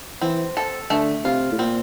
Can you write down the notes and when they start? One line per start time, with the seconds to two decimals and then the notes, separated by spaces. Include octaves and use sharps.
0.21 E3 C4
0.57 A4
0.90 D3 A3
1.25 C3 F4
1.52 A2
1.58 A#2 C4